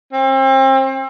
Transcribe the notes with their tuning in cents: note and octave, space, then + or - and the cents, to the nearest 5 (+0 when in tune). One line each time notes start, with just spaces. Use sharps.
C4 +35